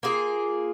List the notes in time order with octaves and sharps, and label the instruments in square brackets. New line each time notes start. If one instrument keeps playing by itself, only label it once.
[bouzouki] A#3 F4 G#4